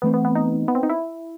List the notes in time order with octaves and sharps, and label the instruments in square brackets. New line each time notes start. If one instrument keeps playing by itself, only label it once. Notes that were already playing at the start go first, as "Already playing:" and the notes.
[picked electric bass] E3 A3 C4 [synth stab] B3
[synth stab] B3
B3
D#4
B3
C4
D#4
E4